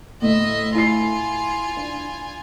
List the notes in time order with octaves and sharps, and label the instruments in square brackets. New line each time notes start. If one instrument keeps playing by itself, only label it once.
[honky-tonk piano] D2 A2 [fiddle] D#5 E5
[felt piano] E4 C7 [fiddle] F4 G#5
[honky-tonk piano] D4